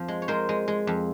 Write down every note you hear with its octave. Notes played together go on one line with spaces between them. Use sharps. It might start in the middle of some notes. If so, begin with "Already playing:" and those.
Already playing: F2 F3
G#3
C#5
G#3 A#4 C5
G#3
G#3
F2